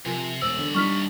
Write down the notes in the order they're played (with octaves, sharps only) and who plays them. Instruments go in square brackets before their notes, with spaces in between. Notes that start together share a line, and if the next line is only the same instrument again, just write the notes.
[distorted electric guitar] C3 [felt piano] F3 A#4 G#5
[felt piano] E1 [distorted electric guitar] D#2 D5 [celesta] C5 E6
[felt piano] D3
[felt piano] G3 D4 D#4 [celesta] C#6 F6 B6